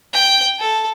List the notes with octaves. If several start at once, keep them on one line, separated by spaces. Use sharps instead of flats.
G5
A4